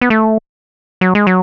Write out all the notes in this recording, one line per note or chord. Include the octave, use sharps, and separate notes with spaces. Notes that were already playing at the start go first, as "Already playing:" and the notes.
B3
A3
F#3
G#3
F#3